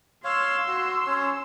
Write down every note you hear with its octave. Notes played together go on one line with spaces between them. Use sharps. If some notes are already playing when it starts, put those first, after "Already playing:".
C#5 F5 C6 E6
F#4
C#4 C#5